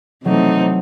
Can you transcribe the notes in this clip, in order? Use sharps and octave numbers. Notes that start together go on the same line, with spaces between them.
C3 E3 F#3 A3 C4 D#4